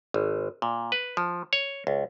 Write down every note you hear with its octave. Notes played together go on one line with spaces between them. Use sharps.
G#1
A#2
B4
F3
C#5
C#2